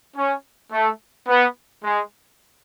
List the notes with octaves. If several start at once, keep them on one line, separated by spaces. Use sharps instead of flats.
C#4
A3
B3
G#3